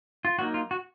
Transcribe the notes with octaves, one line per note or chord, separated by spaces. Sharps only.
F4
F#3 A#3 D#4 F#4
F4
F#4